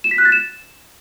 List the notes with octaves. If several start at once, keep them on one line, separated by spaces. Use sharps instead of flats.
E7
B6
F#6
A6
E7